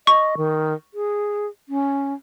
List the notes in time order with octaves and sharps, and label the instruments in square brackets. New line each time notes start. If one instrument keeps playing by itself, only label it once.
[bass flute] D#5 [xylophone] C#6
[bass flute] D#3
G#4
C#4